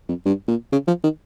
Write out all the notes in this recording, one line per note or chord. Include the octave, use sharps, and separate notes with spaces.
F2
G2
A#2
C#3
F3
D#3